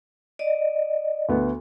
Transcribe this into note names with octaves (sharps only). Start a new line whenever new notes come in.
D5 D#5
D2 B3